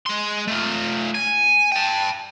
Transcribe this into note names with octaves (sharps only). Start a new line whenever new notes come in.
G#3 C6
A3 F4
G#5
G5 A5